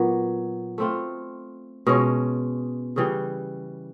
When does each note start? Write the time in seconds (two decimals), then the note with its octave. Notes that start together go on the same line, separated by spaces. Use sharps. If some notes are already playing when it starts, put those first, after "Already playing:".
Already playing: A#2 F#3 B3
0.78 A3 C4 F4
1.87 B2 G#3 C#4
2.96 C#3 E3 G3